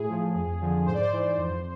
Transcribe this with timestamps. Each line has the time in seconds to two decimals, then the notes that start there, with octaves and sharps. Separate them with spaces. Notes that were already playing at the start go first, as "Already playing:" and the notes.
Already playing: A2 G#4
0.09 F3
0.35 F2
0.61 D3 F3
0.86 G#2 C5
0.94 D5
1.00 C5
1.12 E3
1.37 F2